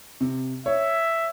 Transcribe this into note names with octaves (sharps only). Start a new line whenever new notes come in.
C3
C#5 E5